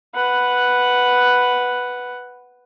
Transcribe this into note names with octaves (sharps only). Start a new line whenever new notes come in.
B4 F#5